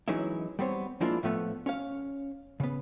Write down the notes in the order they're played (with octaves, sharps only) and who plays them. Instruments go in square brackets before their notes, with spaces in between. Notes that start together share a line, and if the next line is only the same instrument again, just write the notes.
[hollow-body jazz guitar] E3 F#3 G#3 C#4 D#4 E4
G3 B3 C4 C#5
F3 G#3 A#3 D4 E4 F4
A2 F3 A3 B3
C#4 C#5 F5
C#3 B3